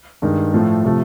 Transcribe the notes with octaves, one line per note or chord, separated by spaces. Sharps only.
G2 D#3 G#3
A2 F3 A3
C3 F3 A3